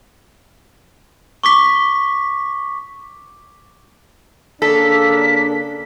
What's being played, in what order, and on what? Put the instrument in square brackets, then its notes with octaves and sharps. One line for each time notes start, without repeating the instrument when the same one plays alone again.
[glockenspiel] C#6 D6 B6
[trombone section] C#3 A#3 D4 [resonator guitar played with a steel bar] A4 [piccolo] B6